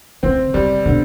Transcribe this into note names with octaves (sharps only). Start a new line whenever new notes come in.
C#3 C4
C3 G3
B2 D3